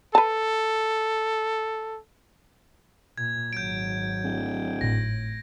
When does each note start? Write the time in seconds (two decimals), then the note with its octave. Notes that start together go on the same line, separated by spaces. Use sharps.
0.15 A4 B4 A5
3.18 A#2 G#6
3.53 G#1 F#3 G6 D7
4.24 D1
4.81 G#1 A2 A#6